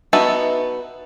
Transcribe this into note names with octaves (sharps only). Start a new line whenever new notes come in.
B3 D#4 F#4 E5 A5